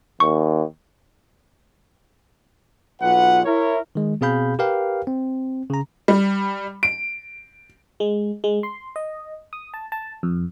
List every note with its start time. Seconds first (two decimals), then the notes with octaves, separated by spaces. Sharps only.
0.20 D#2 C#6
3.02 B1 F4 B4 F#5
3.45 E4 A#4 C#5
3.95 D#3 G#3
4.21 B2 C4 G#4 F5 B5 G6
4.59 G4 A#4 B4 F5 G5
5.07 C4
5.70 C#3 A#5
6.08 G3
6.83 D7
8.00 G#3
8.44 G#3
8.63 C6
8.96 D#5
9.53 D#6
9.74 A5
9.92 A5
10.23 F2